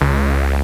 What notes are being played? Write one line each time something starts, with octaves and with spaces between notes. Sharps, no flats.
C#2